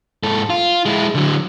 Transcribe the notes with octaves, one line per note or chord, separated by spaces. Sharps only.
G#2 A4
F4
G#3 E4
D3 F#3